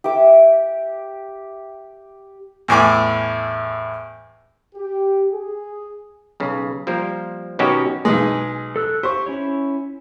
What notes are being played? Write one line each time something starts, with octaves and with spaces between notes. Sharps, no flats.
G4 E5 D6 E6
E2 A2 G#5 D6
G4
G#4
B1 C#3
F3 G3 A#3 A#4 C5
B2 D#3 F#3 C#4 F#4 G4
B1 G#3 G#5
A4 E6 F#6
G4 C5 C#6
C#4 E4 C#5